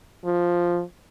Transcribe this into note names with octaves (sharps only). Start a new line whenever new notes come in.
F3